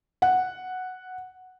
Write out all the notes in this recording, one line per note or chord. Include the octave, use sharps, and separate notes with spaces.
F#5